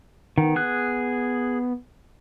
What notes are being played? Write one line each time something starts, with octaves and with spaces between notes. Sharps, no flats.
D#3 B3
G#4 F#6